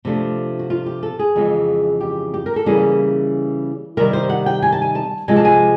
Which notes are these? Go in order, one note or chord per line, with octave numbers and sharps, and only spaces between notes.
C3 F3 A3 D4
F#4
F4
G4
A4
G#4
F2 C#3 E3 G#3 C4
G4
G4
A#4
A4
C#3 E3 G3 A#3 C#4 G#4
C3 D#3 G3 A#4
C5
F#5
G5
G#5
A5
G#5
A5
C3 F3 G#3 C4 G#5
A5
G#5